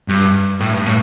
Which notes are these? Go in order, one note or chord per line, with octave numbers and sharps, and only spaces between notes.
G2
A2
G2
A2